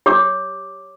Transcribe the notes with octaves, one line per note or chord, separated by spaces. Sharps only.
G4 C#5 D6